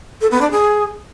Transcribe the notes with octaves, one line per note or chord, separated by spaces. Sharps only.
A4
B3
D4
G#4